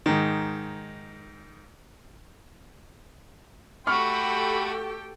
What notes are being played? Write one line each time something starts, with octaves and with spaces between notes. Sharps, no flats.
G#2 D#3
A3 F#4 G4 A4 G5 B5 C#6 F6